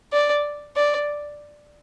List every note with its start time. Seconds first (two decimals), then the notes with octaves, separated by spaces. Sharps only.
0.12 D5
0.76 D5